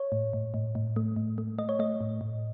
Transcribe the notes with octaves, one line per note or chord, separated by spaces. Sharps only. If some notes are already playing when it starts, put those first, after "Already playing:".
Already playing: C#5
A2
A2
A2
A2
A3
A2
A3
A3 D#5
C#5
A3 D#5
A2
A2